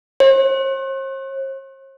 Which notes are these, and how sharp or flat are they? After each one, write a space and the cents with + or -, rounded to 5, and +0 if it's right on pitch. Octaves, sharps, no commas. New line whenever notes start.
C5 +45